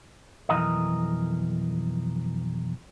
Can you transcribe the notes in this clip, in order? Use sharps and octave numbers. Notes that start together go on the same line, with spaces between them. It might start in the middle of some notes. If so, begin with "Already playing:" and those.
B1 F2 G#2 E3 A#4 D#5